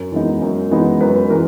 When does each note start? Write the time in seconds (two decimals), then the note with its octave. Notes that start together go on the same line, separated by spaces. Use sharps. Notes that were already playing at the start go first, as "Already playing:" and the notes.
Already playing: F#2
0.12 E3 G#3 B3 D#4
0.42 F#2
0.71 E3 G#3 B3 D#4
1.01 F#2 B4
1.30 E3 G#3 A#4